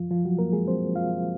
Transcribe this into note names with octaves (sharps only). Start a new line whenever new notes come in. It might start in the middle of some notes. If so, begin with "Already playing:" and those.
Already playing: F#2 F3 F4
F3 F4
F#3 F#4
F#2 A#3 A#4
G#3 G#4
F3 C4 C5
F#2 F4 F5
F3